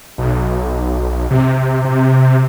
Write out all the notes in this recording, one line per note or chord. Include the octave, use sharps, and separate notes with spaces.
B1
C3
C3